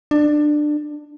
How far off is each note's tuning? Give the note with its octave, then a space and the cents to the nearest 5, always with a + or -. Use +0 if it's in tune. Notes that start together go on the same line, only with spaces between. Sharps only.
D4 +20